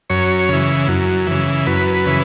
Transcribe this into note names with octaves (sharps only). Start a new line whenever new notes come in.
F#2 C#5
C#3 E3
F#2
C#3 E3
F#2 B4
C#3 E3